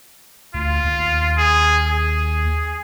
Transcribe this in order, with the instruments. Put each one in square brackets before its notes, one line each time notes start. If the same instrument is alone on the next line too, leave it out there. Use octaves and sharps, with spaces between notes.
[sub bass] D2 [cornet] F4
[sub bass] D#2
[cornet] G#4
G#4